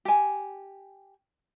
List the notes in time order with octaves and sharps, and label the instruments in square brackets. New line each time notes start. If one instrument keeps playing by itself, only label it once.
[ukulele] G4 G#5